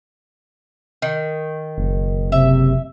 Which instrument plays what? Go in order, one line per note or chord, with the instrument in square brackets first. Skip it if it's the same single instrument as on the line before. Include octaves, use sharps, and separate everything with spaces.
[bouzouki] D#3
[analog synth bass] F#1
[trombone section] C3 [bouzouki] E5